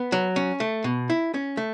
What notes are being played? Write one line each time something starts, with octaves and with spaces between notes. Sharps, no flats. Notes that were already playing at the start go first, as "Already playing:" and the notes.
Already playing: B3
F#3
C#4
A3
B2
E4
C#4
A3